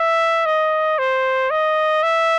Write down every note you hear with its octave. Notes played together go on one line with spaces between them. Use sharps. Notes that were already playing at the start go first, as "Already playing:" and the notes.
Already playing: E5
D#5
C5
D#5
E5